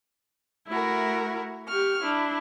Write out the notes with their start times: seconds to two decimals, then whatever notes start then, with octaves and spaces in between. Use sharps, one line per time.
0.68 A3 E4 F#4 A#4
1.67 G4 C#6 F6
2.02 D4 E4